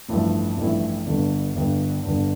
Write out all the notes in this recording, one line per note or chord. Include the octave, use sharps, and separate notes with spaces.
A1 G2 F3 A3 E4
A1 G2 F3 A3 E4
G1 G2 D3
G1 G2 D3
G1 G2 D3